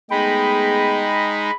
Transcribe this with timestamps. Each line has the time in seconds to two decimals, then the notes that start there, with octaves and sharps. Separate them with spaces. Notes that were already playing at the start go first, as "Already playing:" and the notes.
0.11 G#3 A3 B3 D#4 G#4 G5 B5